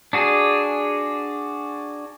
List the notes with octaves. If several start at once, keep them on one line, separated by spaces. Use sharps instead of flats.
D4 F#4 G#4